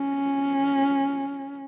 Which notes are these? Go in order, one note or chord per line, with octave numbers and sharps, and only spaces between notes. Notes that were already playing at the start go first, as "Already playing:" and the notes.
Already playing: C#4